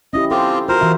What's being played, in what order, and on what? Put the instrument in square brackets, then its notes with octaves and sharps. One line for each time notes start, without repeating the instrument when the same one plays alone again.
[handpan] C#4 E4 G4 [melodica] D#5
[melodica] C4 F4 G4 [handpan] A4
[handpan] F4 F#4 [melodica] A#4 C5
[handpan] E3 F#4 E5